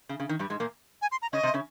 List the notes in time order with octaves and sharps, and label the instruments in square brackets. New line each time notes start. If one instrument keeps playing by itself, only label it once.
[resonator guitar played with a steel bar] C#3
C#3
D#3
G2 G3
G#2 G#3
A#2 A#3
[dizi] G#5
C6
A#5
[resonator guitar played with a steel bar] C#3 C#4 [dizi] D#5
[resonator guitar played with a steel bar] C3 C4
C#3 C#4